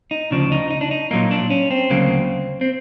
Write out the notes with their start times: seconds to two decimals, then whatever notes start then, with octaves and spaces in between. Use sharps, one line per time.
0.11 D#4
0.31 D2 C#3 F3 D4
0.52 D#4
0.71 D#4
0.81 D4
0.91 D#4
1.11 A#2 F#3 A#3 D#4
1.31 D4
1.50 C#4
1.71 C4
1.90 D2 C#3 F#3 A#3
2.61 C4